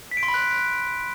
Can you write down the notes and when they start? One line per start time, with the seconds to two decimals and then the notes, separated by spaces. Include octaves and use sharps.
0.11 B6
0.17 D7
0.23 C6
0.28 B5
0.34 F#6